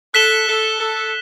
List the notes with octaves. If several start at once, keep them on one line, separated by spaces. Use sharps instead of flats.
A4 F#6 B6 E7 G7
A4
A4